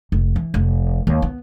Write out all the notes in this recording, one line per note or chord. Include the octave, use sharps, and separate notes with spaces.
F1
E3
F1
D#2
B3